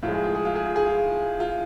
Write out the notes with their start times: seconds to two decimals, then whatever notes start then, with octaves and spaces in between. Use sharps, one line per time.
0.03 A2 F3 G#3 F4
0.14 G#4
0.23 F4
0.35 G#4
0.45 F4
0.55 G#4
0.65 F4
0.76 G#4
0.86 F4
1.40 F4